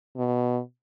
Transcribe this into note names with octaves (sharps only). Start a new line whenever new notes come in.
B2